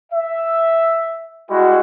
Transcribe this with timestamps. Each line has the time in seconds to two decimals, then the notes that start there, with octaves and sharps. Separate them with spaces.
0.13 E5
1.50 G3 G#3 E4 F#4